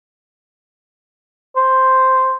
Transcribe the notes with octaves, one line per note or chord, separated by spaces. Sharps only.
C5